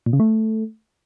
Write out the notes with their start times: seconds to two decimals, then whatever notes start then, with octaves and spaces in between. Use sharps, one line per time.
0.06 A#2
0.13 C#3
0.20 A3